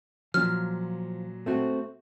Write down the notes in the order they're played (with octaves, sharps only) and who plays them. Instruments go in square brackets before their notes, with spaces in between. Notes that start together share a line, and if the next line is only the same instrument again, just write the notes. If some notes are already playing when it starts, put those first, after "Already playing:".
[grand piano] A#2 F#3 [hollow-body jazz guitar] F3 [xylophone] F6
[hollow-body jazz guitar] A3 C4 F#4